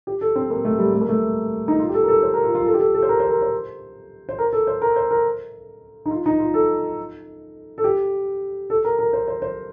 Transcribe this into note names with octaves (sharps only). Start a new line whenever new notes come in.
G4
A4
C4
A#3
A3
G3
A3
A#3
A3
D#4
F4
G4
A4
A#4
A4
C5
A#4
F4
F4
A4
G4
A4
A4
C5
A#4
C5
A#4
C5
C5
A#4
A4
C5
A#4
C5
A#4
D#4
F4
D#4
F4
A4
A4
G4
A4
A#4
A#4
C5
C5
C5